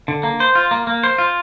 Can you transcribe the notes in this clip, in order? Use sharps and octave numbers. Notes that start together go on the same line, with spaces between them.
D3
A#3
C5
F4
A#3
A#3
C5
F4